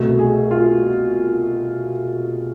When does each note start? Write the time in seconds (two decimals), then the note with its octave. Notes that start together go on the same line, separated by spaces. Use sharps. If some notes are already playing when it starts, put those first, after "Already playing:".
Already playing: C2 B2 A3
0.19 G#4
0.51 F4